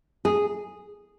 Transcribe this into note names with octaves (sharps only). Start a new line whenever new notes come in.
G#4